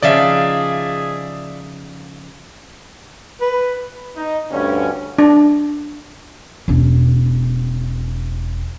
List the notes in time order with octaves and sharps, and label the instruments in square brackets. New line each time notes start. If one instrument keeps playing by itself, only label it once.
[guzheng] C#3 F3 D#4 [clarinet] G#4 [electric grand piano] D5 E5
[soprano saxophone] B4
[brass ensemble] D#4
D2 G2 D3 C#4
[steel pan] D4
[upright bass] E1 C#4